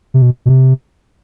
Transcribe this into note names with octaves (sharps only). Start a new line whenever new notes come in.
C3
B2
B2
C3